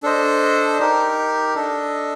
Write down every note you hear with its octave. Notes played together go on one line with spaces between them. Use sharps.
D4 A4 C5 D#5
D#4 G4 A#4
D4 A4 D#5